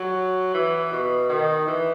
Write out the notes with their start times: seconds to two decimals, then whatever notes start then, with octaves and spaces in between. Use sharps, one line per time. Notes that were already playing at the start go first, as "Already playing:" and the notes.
Already playing: F#3
0.54 E3
0.92 B2
1.29 D#3
1.66 E3